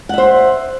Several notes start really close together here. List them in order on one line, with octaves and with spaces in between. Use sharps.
F#5 E5 C5